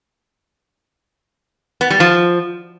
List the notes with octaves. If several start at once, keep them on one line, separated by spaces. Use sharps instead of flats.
B3
G3
F3